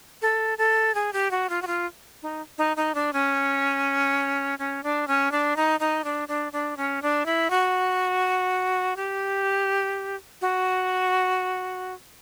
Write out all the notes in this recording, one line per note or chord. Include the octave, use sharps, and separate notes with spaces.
A4
A4
G#4
G4
F#4
F4
F#4
F4
D#4
D#4
D#4
D4
C#4
C#4
D4
C#4
D4
D#4
D#4
D4
D4
D4
C#4
D4
E4
F#4
G4
F#4